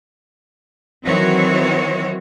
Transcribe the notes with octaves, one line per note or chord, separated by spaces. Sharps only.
D#3 E3 F#3 C4 F#4 C#5